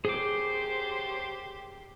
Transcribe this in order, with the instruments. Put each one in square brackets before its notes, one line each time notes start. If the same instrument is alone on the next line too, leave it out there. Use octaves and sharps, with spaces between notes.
[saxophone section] F#2 C5 [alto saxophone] G4 [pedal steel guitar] G#4 D6